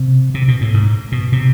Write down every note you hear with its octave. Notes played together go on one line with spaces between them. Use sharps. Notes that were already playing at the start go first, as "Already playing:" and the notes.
Already playing: C3
C3
B2
A2
G#2
B2
C3